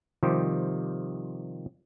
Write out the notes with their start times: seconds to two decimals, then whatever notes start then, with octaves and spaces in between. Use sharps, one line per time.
0.23 C3 D#3 F3 G3 G4 C5